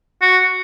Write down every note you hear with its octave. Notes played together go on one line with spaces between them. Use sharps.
F#4